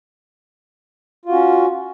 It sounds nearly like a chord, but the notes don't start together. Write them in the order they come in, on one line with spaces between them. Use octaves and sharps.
F4 F#4 C#4